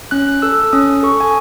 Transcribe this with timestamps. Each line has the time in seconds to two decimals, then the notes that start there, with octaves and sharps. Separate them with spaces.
0.11 C#4 F#6
0.42 A4 E6
0.73 C#4 D#6
1.03 A4 C#6
1.21 G#5